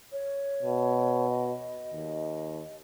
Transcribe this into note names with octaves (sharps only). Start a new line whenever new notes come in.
C#5
B2
D#5
D#2